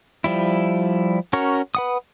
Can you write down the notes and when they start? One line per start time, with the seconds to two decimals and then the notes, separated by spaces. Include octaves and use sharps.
0.24 F3 G3 E4
1.33 C#4 F#4 A#4 C#5
1.75 B4 F#5 D#6